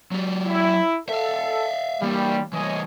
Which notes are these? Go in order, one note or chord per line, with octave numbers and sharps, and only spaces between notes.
F#3 G4
E4
A4 E5 F5
E3 G3 A#3
E3 G3 C#5 D#5 G#5